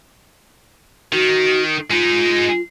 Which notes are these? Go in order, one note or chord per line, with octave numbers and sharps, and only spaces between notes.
D#3 F#4
G#3 D#4 F4